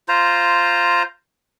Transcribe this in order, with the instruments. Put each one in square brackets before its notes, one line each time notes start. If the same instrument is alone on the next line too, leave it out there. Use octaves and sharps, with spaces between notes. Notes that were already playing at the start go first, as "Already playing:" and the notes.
[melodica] F4 C5 A#5